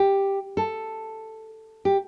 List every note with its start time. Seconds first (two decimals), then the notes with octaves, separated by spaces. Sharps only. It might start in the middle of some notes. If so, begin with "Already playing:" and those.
Already playing: G4
0.57 A4
1.85 G4